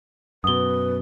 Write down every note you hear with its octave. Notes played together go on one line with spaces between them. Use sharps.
F#2 B2 B4 D#6 G7